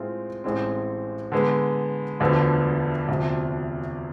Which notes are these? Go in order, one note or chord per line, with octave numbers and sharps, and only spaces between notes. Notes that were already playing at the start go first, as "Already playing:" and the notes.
Already playing: A2 G#3 C4 F4
A1 A2 G#3 C4
D3 G#3 B3
E1 D2 D3 F3 B3
E1 D2 C3 F3